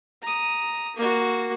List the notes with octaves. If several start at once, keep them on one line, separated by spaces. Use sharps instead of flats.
A#5 D#6
A#3 F#4